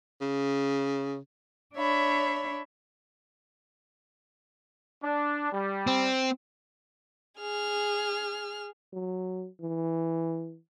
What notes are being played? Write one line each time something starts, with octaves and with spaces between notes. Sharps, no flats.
C#3
D4 C#5 E5 B5
D4
G3
C4
G#4 F6
F#3
E3